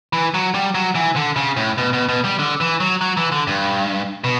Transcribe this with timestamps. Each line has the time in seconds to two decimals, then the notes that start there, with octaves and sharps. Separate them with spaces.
0.13 E3
0.34 F#3
0.54 G3
0.75 F#3
0.95 E3
1.16 D3
1.36 C#3
1.57 A2
1.78 B2
1.93 B2
2.09 B2
2.25 G3
2.39 D3
2.61 E3
2.80 F#3
3.01 F#3
3.17 E3
3.32 D3
3.47 G2
4.24 B2